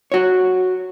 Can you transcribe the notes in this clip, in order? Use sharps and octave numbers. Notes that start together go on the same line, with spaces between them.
F#4 C#5